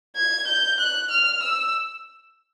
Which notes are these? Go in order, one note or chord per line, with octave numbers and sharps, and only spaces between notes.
G#6
G6
F#6
F6
E6